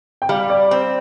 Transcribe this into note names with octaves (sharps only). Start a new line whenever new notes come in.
G5
G3 F5
D5
C4